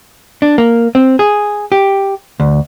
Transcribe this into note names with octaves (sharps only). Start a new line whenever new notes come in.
D4
A#3
C4
G#4
G4
D2